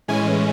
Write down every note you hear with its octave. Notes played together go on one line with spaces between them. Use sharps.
A2 E3 G#3 C#4 G#5